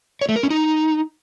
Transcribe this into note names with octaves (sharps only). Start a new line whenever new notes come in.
C#5
A3
A#4
C#4
D#4